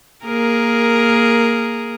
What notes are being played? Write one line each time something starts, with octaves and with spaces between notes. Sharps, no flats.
A#3 G#4 A#4